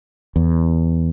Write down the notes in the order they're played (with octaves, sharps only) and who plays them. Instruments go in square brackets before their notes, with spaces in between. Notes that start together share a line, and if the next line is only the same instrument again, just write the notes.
[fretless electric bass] E2